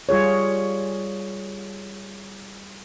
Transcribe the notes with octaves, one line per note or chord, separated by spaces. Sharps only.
G3 F4 G#4 C#5